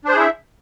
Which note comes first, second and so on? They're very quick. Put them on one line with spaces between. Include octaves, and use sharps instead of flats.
D4 C5 G#4 E4 E5